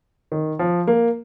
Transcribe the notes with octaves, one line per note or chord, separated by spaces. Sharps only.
D#3
F3
A#3